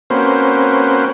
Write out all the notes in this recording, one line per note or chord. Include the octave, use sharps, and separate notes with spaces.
A#3 C4 C#4 F#4 B4 C5